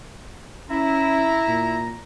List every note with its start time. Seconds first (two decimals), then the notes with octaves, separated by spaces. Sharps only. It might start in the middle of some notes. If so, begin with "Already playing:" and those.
0.70 C#4 E4 A#5
1.47 A#2